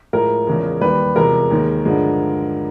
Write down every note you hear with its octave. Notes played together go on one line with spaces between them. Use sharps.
A2 F3 G#3 A#4
E2 C#3 F3 G#3
D#2 D#3 G3 B4
E2 C3 F3 G#3 A#4
D#2 D#3 G#3
G2 D3 F3 G#3